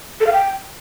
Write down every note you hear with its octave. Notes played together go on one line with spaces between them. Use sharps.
A4
F5
G5